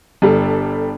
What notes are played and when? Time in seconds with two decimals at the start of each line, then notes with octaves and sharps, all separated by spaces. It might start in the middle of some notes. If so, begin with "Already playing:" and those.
0.22 G1 G3 A4